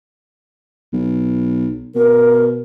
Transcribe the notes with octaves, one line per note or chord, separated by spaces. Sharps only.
B1
B2 A#4